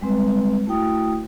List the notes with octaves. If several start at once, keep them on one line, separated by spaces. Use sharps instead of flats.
G3 G#3 C4 B4
A3 E4 F#4 G5 D#6